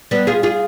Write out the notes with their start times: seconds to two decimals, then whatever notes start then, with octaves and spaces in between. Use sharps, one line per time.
0.11 G3 B3
0.27 F4 G#4
0.43 F4 G#4